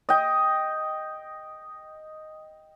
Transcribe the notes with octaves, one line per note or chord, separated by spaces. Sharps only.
D#5 G5